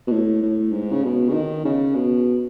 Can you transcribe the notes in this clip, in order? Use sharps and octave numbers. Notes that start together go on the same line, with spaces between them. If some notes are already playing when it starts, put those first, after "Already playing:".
B2
A2
A2
G#2
C#3
B2
C#3
D#3
C#3
B2